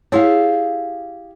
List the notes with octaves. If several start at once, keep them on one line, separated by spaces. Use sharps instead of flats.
E4 G4 G#4 C#5 E5 F5 A5